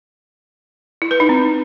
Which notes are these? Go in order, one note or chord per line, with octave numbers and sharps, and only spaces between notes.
E4
B4
D#4
C4